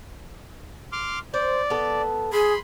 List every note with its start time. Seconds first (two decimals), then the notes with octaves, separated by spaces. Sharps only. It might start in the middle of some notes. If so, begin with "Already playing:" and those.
0.92 C6 D6 F6
1.34 C5 D5
1.70 B3 A4
2.33 G#4 B5 C6